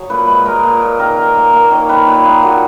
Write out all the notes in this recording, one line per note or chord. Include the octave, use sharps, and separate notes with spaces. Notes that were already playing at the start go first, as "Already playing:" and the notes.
Already playing: F#3 G#4 C#5
A#2 B4
G#3 B4
G#3 A#4
A#2
A#2
D#3 A#4
D#3
A#3
A#3
D#3 C#5
D#3 B4
A#2 B4
A#3 G#4
A#2 F#4